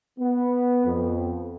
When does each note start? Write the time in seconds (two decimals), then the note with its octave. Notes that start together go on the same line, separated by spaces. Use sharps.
0.19 B3
0.86 F2